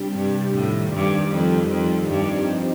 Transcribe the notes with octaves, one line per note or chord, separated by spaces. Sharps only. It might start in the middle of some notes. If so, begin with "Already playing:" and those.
Already playing: C3 G3 D4 G4
G2
F2 A2 D#3 G3
G2
F2
F2
G2 F3 C4 D#4 G4